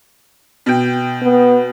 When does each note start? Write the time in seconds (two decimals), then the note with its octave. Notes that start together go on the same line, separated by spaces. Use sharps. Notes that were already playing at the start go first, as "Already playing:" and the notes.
0.66 B2 G5
1.22 B3